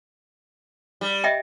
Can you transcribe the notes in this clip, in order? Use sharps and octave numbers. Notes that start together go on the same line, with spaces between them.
G3
D#5 E5 G5